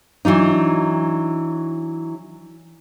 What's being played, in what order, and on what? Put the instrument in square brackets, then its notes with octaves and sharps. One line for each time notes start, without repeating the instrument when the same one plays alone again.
[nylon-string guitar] E3 F#3 D4 D#4